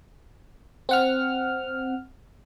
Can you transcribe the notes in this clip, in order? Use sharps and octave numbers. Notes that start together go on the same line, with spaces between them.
C4 F#5 F6